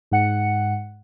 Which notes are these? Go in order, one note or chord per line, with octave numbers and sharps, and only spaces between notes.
G#2 F#5 C#7